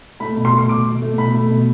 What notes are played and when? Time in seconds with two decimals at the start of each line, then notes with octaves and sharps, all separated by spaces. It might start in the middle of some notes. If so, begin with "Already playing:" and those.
0.20 A3 B5
0.37 B2
0.45 C6
0.53 A3
0.58 C6
0.69 B2 D6
0.86 B2
1.02 A3
1.18 B2 B5
1.34 A3
1.50 B2